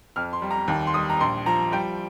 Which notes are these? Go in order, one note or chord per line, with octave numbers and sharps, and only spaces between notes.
F2 F6
C6
G3
A#5
D#2
C6
G3 D#6
A#5
A#1 C6
F3 A#5
G3 G5